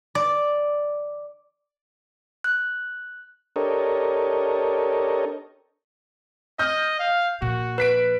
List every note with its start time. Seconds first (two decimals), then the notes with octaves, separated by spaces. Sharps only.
0.15 D5
2.44 F#6
3.56 D4 G4 A4 A#4 C#5 D#5
6.59 D#5 F6 G6
6.99 F5
7.42 A#2 F3 F#4
7.78 B4 F#6 B6 D7